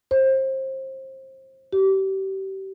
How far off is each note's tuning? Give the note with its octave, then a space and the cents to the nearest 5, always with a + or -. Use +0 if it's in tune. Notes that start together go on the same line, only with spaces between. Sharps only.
C5 +25
G4 -30